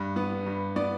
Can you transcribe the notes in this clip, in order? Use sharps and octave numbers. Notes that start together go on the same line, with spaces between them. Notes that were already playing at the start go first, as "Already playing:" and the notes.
Already playing: G2
B3
G2
B3 D5